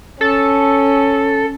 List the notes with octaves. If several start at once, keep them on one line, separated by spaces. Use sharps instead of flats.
C#4 A4